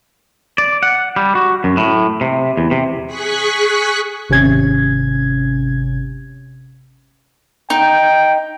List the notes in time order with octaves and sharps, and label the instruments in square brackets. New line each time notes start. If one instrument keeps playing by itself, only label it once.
[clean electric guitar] D5
F#5
G3
F#4
F#2
A2
C3
E2
C3
[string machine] G#4 C#6 F#6 B6
[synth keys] G#1 C3 C#4 G#6
[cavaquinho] D#4 [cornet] G5